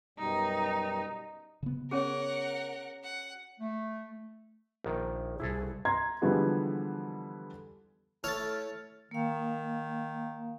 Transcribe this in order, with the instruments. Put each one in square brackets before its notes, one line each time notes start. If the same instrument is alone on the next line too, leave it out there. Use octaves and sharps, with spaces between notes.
[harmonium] F#2 B2 G3 [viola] D#4
[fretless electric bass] C#3 B3
[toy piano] C#4 G#4 [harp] F#4 C#5 D5 [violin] A#4 F#5
[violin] F#5
[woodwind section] A3
[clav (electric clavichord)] A#1 D#3
[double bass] C2 [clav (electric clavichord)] E4 G#4 A4
[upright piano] A#5 C6 G#6
D3 E3 F3 G3 G#3 B3
[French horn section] A3 [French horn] E4 [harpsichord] A4 C#5 [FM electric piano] F6 A6
[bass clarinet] D#3 [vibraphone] A#3 F5